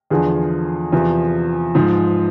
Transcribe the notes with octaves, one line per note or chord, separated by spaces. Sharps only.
E2 D3 F3 G#4
E2 C3 F3
G#2 F3